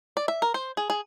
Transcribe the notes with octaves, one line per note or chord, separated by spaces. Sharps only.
D5
E5
A#4
C5
G#4
G#4